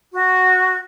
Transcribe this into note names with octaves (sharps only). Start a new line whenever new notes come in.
F#4